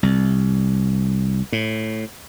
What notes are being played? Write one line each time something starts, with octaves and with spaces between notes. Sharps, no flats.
C2
A2